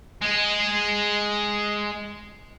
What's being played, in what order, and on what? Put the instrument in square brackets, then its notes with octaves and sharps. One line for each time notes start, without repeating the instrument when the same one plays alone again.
[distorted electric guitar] G#3 G#4